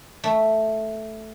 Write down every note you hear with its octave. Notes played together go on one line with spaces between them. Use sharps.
A3